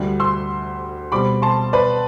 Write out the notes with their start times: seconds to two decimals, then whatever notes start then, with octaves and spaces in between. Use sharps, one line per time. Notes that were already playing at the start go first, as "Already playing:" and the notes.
Already playing: D2 D3 G3
0.20 C6 E6
1.12 B2 G3 C4 B5 D6
1.42 A5 C6
1.73 B4 D5